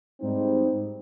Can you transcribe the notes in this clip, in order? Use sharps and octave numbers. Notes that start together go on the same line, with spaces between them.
G#2 G3 C4 D#4